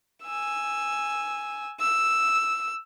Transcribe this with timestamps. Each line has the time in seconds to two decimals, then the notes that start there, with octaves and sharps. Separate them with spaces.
0.24 G#5 E6
1.80 E6